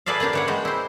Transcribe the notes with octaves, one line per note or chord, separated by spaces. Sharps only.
G#4 A4 B4 D5 E5 F5
A#3 C#4 D4 G4
E3 C#5 F#5
G3 G#3 F#4 G4
E4 C5